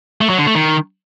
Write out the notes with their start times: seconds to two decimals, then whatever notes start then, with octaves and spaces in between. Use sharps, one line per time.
0.21 A3
0.30 F#3
0.38 D3
0.47 A3
0.55 D#3